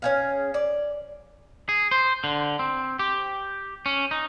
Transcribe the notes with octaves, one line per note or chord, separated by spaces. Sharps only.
C#4 G#4 F5
D5
G#4
C5
D3
C4
G4
C#4
D#4